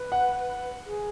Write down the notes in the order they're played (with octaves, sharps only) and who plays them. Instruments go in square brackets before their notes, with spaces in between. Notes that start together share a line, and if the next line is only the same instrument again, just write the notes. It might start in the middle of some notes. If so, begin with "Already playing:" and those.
Already playing: [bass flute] B4
[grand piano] F#5
[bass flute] G#4